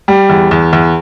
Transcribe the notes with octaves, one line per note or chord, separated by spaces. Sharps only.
G3
E2
E2
E2